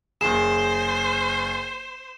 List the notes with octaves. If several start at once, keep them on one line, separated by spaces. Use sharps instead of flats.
F#1 G#4 C5 E7